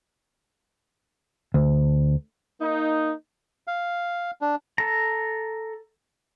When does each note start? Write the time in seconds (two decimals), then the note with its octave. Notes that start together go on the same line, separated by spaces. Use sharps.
1.54 D2
2.61 A#3 D#4
3.67 F5
4.41 D4
4.78 A4 A#5